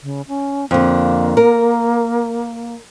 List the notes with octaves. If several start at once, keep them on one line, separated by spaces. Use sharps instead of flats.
C#3
C#4
F2 D3 A#3
A#4